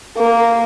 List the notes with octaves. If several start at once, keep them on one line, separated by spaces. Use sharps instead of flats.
A#3